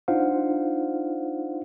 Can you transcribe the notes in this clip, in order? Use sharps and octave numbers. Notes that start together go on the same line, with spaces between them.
D4 D#4 F4 C5 F5 F#5